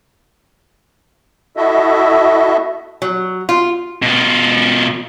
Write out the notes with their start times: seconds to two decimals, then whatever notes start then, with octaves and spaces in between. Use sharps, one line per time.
1.57 E4 F#4 A4 D#5 E5
3.02 F#3
3.49 F4
4.02 B2 F4